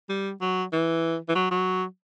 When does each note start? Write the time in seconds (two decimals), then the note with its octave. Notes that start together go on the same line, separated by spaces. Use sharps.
0.09 G3
0.41 F#3
0.72 E3
1.29 E3
1.35 F#3
1.51 F#3